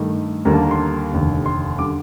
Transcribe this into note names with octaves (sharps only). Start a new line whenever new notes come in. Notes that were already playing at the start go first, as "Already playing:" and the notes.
Already playing: G2 D#3 A3
D#2 D3 G3 A#3 A#5
A5
A#5
C6
F1 D#2 D3
C6
D3 G3 D6